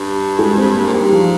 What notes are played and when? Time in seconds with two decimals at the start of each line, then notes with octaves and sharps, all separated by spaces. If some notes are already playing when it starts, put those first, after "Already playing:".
Already playing: G2
0.39 G#3 G#4
0.57 C4 C5
0.75 A#3 A#4
0.87 A#2
0.94 G#2 G3 G4
1.12 F3 F4